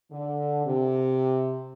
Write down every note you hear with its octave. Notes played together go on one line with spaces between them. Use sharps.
D3
C3